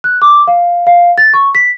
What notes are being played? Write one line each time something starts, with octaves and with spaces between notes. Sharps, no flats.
F#6
D6
F5
F5
A6
C#6
B6